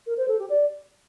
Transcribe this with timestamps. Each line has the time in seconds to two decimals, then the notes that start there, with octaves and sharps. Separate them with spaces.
0.07 A#4
0.17 C5
0.28 A4
0.39 G4
0.50 D5